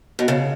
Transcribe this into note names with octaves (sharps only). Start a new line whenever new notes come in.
B2
C#3